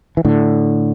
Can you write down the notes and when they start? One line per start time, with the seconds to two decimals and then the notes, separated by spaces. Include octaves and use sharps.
0.17 E3
0.25 A2 D3